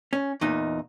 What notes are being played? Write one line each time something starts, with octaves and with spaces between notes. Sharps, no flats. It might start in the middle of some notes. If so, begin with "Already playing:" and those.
C#4
E2 A#2 D#4